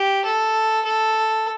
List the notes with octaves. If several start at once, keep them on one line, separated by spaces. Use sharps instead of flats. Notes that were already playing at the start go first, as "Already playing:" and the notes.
Already playing: G4
A4
A4